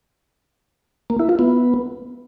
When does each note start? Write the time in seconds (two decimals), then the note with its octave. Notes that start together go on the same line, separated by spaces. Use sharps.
1.10 A#3
1.19 E4
1.29 F4
1.39 B3